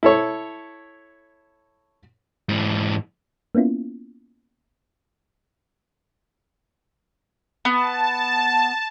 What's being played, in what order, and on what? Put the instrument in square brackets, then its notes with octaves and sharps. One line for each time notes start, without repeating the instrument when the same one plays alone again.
[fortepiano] E4 A4 C#5
[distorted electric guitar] G#2 E3
[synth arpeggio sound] A#3 B3 C#4 E4 F4
[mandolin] B3 [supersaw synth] A5